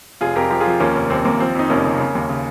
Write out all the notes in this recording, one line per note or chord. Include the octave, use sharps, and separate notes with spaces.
F1 F4 G#4
F2 G4 A#4
F3 G4 A#4
F4 G#4
F3
D#2 A#3 C#4
F1
D#2 C4
D#2 A#3
F3 C4
F2 D#4
F1 A#3 C#4
C#3
C#3
D#2
C#3